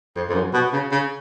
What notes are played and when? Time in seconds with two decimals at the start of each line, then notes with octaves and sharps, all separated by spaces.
0.16 F2
0.30 F2
0.34 F#2
0.54 B2
0.73 C#3
0.92 C#3